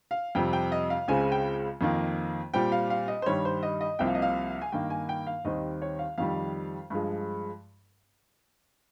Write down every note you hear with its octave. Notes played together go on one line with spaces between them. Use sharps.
F5
F2 C3 G3 G5
G5
D#5
F5
C#2 C#3 G#3 C4 G#5
G5
F2 D#3 A#3
A#2 G3 C4 G5
F5
F5
D#5
C5
G2 D#3 G3 C#5
C5
D#5
D#5
C2 C3 F3 A#3 G5
F5
D#5
F5
G#5
G2 D#3 A#3 G5
G#5
G5
F5
D#2 D#3 G3 C4 D#5
C#5
F5
F2 D#3 G3 F5
G2 F3 G#3